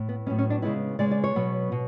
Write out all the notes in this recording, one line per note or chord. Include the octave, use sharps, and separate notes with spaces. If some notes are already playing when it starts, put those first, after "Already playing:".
Already playing: A2
B3
A2 F#3 B3 C#4
C#4
D4
C#3 G#3 B3 E4
C#3 G#3 B3 D5
D5
C#5
B2 F#3 B3
B2